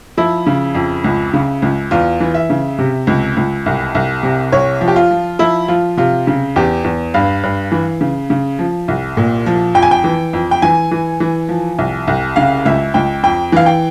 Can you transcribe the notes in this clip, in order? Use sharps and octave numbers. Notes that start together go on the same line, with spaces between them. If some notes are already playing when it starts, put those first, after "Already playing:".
F3 E4
C#3
F2
C#2
C#3
C#2
E2 F4
E3
E5
C#3
C3
C#2
C#2
C2
C2
C3
C2 C#5
F3
G4
F4
F3
F3 E4
F3 F4
C3 F4
C#3
E2 G4
E2
G2 F5
G2
E3
C#3
C#3
F3
C2
A#2
F3
F2 G5
G#5
G5
E3
F2
G5
E3 G#5
E3
E3
F3
C2
C2
C#3 F5
C#2 E5
C#2 G5
F2 G5
E3 F5
G5